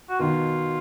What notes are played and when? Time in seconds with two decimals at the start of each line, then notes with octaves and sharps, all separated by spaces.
0.09 F#4
0.19 B2 D#3 F4